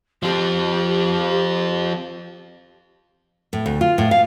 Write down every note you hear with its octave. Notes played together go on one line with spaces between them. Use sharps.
F3 C4 G4
A2
D2
F4
A2
F5